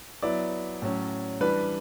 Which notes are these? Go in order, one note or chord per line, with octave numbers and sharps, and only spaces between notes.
F#3 B3 E4 D5
A2 F#3 C#4
E3 G3 D4 B4